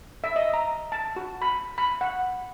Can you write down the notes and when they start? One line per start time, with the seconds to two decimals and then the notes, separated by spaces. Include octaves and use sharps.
0.24 E5
0.36 D#5
0.54 A#5
0.92 A5
1.16 F#4
1.42 B5
1.78 B5
2.01 F#5